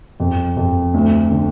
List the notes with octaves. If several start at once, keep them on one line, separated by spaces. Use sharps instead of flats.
F2
F2
D2
D3